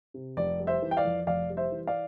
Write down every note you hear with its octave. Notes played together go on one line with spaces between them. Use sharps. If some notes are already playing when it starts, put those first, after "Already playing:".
C3
F1 D5
G3
C5 E5
E3
G5
D5 F5
F2
F1 D5 F5
G3
C5 E5
E3
D5 F5